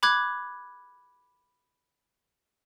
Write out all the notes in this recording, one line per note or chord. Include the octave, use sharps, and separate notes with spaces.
B5 D6 F#6 G#6